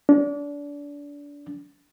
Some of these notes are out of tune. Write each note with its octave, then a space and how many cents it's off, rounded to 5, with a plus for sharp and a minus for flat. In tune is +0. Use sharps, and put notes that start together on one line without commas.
D4 -30